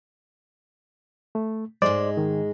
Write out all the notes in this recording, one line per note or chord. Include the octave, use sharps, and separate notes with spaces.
A3
G#2 G#3 C5 D5
D#3